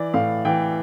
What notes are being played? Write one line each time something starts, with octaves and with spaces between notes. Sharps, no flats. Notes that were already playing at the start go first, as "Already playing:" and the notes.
Already playing: E3 D5
A2 F5
E3 G5